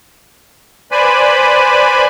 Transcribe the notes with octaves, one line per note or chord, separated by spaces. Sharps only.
B4 C5 D5 G#5 B5